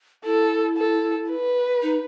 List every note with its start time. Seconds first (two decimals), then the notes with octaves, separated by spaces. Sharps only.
0.25 E4 A4
0.77 A4
1.30 B4
1.82 D#4